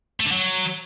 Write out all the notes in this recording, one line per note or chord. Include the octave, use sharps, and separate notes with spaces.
A3
D3
F#3